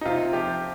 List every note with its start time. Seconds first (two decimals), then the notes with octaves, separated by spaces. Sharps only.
0.01 D#4
0.05 C3 F4
0.33 F3 G4